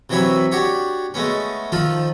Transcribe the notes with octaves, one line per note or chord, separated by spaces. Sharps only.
C3 E3 F#3 C#5 E5 B5
D4 F#4 G4 C#5
G#3 A3 B3 C#4
D#3 F3 F4 A4